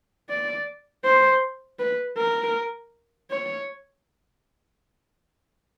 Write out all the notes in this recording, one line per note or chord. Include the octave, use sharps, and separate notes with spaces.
D5
C5
B4
A#4
C#5